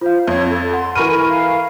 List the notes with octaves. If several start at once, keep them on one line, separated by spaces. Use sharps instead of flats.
F4 C5 F5
F2 C#5
A4
F#5 C6
E3 A4 A#4 B5 C#6 F6 D#7
F5